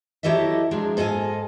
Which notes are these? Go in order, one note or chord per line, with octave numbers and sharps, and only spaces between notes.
F#3 E4 G4 A4 D#5 E5
F3 F#3 G#3 D4
G#2 A4 D#5 F5 G#5